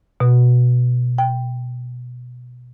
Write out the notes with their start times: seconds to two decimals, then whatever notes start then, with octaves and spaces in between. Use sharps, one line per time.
0.20 B2
1.18 G5